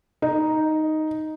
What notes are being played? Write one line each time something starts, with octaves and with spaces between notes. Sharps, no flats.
D#4